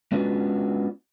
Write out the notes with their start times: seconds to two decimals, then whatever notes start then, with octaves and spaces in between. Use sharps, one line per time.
0.12 G#3 B3 C#4 D4 F4 F#4